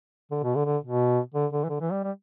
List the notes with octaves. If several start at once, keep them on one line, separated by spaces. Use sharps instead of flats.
D3
B2
D3
D3
B2
D3
D3
E3
D3
E3
G3
G3